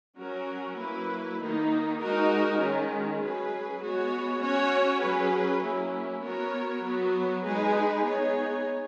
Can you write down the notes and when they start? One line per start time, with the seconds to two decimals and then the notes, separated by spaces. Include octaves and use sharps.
0.17 F#3 C#4 F#4 A#4
0.77 F#3 A#3 E4 B4
1.38 D#3 A#3 D#4
1.99 G#3 D#4 F#4 A#4
2.58 D#3 G#3 C#4
3.20 F#3 C#4 G#4 B4
3.80 G#3 B3 F#4 C#5
4.41 C#4 F#4 C#5
5.00 F#3 C#4 G#4 B4
5.61 F#3 A#3 C#4 E4
6.21 B3 F#4 A#4 C#5
6.82 F#3 B3 F#4
7.43 G#3 D#4 G#4 B4
8.03 B3 D#4 G#4 C#5